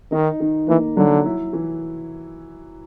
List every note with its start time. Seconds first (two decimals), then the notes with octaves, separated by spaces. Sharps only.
0.12 D#3 D#4
0.40 D#3
0.68 E3 A#3
0.97 D3 F#3
1.25 E4
1.53 E3